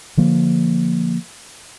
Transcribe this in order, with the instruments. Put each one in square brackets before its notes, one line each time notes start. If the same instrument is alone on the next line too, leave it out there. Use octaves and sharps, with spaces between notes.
[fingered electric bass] D3 F3 A#3